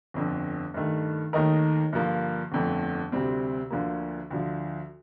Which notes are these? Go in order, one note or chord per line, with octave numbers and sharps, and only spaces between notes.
G1 F2 D3
G2 D#3 A3
D#2 D#3 A3 D#4 A#4
G2 D3 F3 A#3
G1 F2 D3 A3
D2 C3 G3 C4
D2 D3 F3 A#3
D2 D3 F3